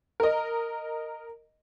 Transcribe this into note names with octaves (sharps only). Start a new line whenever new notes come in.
A#4 D#5